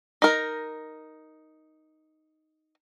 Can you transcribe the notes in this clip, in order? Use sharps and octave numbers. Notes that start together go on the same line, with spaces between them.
D#4 A#4